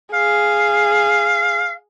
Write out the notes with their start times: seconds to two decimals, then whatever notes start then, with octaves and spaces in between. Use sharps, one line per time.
0.14 G#4 F5